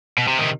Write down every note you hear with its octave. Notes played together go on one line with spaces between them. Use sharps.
B2
C3
C3 D#3